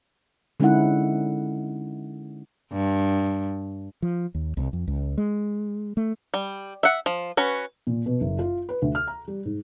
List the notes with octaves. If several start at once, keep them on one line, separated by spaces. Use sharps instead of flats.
D3 G#3 C#4 D#4 E4 F#5
G2
F3
D#2
C2
F2
C#2
G#3
A3
G3
E5 F#5
F3
C#4 F#4 B4
A#2
B2
F#1
F4
B4
D2
F6
A#5
G3
G#2